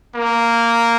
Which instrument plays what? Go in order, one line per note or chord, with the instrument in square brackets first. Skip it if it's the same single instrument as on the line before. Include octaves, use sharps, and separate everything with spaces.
[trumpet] A#3